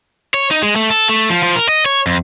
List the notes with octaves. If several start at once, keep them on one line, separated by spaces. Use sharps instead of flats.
C#5
D#4
G#3
A3
A4
A3
F3
F3
A#4
D#5
C#5
F2